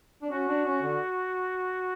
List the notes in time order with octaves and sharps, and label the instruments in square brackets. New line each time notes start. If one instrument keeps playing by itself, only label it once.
[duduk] D4
[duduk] C#4 [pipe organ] F#4
[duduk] D4
C#4
D3